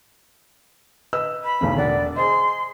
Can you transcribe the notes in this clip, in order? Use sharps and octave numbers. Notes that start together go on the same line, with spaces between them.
B4 D#5 E6
B5
B1 E2 A2
E1 D5 F#5
G#4 C5 D#5 C6